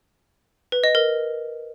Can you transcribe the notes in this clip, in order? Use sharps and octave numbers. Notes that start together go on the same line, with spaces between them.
B4
D#5
A#4